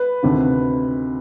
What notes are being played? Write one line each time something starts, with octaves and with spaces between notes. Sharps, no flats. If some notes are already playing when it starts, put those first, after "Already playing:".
Already playing: B4
D2 C3 D#3